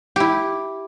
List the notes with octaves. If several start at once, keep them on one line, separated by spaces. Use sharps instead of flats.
E4 G4